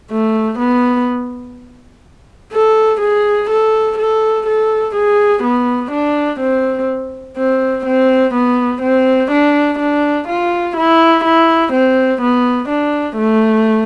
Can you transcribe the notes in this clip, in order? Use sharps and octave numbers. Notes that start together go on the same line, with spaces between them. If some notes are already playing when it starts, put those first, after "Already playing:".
A3
B3
A4
G#4
A4
A4
A4
G#4
B3
D4
C4
C4
C4
B3
C4
D4
D4
F4
E4
E4
C4
B3
D4
A3